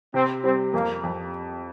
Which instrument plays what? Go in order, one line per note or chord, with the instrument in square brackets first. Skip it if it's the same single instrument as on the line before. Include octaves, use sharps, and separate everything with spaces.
[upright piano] C3 [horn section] C4
[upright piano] G3 [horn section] C4
[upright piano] F2 [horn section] A#3
[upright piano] F2